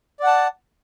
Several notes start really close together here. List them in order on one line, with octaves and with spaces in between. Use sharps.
D5 F#5 A5